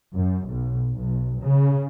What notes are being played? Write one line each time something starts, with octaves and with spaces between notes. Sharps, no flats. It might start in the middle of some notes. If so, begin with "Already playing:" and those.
F#2
B1
B1
C#3